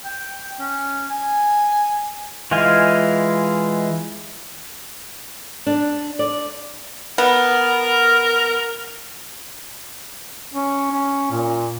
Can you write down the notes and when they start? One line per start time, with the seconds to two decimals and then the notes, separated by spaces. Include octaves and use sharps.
0.05 G5
0.59 C#4
1.10 G#5
2.51 E3 G#3 F4 F5 G#5
5.66 D4
6.19 D5
7.18 B3 A#4
10.54 C#4
10.91 C#4
11.31 A#2